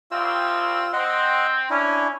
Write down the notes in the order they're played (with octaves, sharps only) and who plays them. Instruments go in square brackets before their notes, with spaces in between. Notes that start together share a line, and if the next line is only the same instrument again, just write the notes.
[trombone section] C2 C4 [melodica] F4 E6
[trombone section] C4 [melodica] D#5 F#5
[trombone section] C#4 [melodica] D4 E4